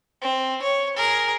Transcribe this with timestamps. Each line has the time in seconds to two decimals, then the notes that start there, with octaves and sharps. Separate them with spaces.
0.22 C4
0.62 C#5
0.97 G#4 A#4